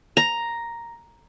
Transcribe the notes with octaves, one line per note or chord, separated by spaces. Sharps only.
A#5